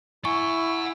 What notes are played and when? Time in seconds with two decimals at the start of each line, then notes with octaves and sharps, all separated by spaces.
0.25 E4 F#5 G#5 C#6